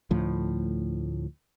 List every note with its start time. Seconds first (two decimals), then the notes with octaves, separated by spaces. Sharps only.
0.11 D2 A2 F3